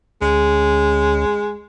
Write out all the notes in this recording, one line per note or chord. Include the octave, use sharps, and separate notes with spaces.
D2 G#3 C#4